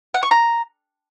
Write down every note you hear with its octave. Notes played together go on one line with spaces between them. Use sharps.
F#5
C#6
A#5